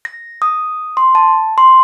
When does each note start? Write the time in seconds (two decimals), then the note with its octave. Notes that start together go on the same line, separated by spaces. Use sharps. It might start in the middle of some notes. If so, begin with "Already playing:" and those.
0.05 A#6
0.42 D#6
0.97 C6
1.15 A5
1.58 C6